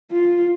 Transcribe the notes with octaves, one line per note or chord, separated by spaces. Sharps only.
F4